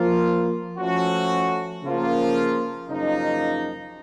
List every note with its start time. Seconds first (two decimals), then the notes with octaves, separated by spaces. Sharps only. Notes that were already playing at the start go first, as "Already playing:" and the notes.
Already playing: F3 A#3 F4
0.77 F3 A3 C#4 F#4
1.83 C#3 F3 A#3 F4
2.89 F#2 C#3 F3 A#3 D#4